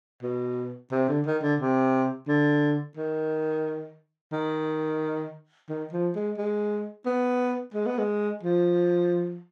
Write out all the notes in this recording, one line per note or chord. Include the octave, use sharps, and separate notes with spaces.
B2
C3
D3
D#3
D3
C3
D3
D#3
D#3
D#3
F3
G#3
G#3
B3
G#3
B3
G#3
F3